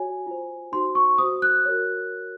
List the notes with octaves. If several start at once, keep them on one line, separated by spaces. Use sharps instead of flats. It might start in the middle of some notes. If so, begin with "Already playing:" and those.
Already playing: F#4 C#5 G#5
F4 C5
D#4 F#4 C5 C6
C#6
F#4 C5 D#6
F#6
F#4 A#4 C#5